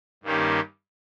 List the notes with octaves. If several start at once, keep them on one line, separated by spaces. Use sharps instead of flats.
G2 D#3 A#3 C#4 G4